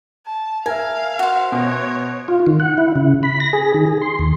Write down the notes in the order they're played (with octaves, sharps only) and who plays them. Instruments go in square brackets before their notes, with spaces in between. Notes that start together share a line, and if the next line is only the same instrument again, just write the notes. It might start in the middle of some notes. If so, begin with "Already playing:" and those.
[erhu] A5
[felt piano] A#4 E5 [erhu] F5 [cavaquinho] G#5
[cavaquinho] F#4 C5
[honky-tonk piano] B2 [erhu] C#5
[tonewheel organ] F4
D#3
F#5
E4
C#3
B5
A#6
G#4
D#3
G#4
C6
D#2